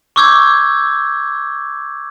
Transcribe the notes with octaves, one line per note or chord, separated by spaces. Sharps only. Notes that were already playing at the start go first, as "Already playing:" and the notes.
C#6 D6 E6 G6 G#6